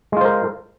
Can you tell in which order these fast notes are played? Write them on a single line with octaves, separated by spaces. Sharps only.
G#3 F4 C5 A#4